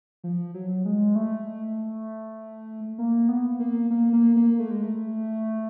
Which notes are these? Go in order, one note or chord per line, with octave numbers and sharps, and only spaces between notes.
F3
F#3
G#3
A3
A#3
B3
A#3
A#3
A#3
A#3
A3
G#3
A3